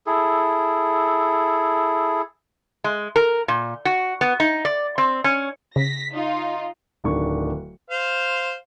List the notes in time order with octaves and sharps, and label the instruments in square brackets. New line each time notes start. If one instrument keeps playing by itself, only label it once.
[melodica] E4 G#4 A4
[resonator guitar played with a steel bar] G#3
A#4
A#2
F#4
B3
D#4
D5
C4
C#4
[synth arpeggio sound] C#3 [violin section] A#6 B6
[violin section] D#4 F4
[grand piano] D1 D#3 D4 C#6
[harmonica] C5 F5